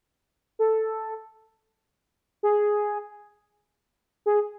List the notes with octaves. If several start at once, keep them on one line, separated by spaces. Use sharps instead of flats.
A4
G#4
G#4